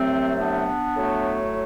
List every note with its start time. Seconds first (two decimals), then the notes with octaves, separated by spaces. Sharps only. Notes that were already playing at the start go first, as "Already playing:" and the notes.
Already playing: C2 C3 F#3 A3 C4
0.39 B3 D4
0.97 A2 F#3 A3